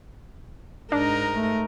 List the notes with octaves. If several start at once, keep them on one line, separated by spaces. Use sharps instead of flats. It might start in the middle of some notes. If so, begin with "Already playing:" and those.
G#2 D4 D#4 A#4
A3